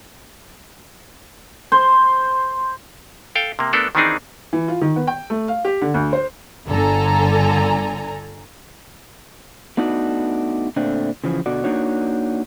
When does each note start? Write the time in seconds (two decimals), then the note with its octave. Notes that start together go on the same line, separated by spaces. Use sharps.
1.72 C5
3.35 A4 F5 G5
3.59 C3 A#3
3.73 A3 B3 D4 A4 A#4
3.95 D#3 E3 C4 D4 D#4 G#4
4.53 E3
4.68 F4
4.81 D#3
4.96 B3
5.07 G5
5.30 A3
5.48 F5
5.65 G4
5.81 D3
5.94 D2
6.13 C5
6.67 G1 D3 A4 G#5 A#5
9.77 A3 B3 D4 D#4 F#4
10.76 A#2 D3 A3 C4 D4
11.24 C#3 E3 F3
11.46 B2 D3 F#4 D5
11.64 A#3 D4 D#4 F#4 C#5